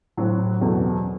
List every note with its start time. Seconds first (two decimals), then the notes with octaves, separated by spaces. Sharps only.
0.17 A2 F#3 C4 F#4
0.61 E2 B2 F#3 A3